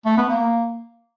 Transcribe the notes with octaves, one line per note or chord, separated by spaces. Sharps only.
A3
B3
A#3